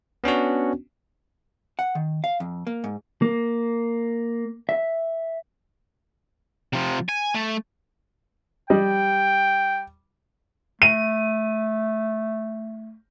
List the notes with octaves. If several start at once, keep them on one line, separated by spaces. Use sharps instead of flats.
B3 C#4 D4 F#4
F#5
D#3
F5
F2
A#3
G#2
A#3
E5
C3 F3
G#5
A3
G3 D#5 G5
A3 D#7